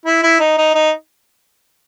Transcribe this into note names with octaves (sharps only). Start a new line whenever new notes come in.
E4
E4
D#4
D#4
D#4